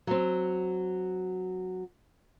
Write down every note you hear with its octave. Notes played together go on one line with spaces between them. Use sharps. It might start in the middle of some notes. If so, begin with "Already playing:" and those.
F#3 C4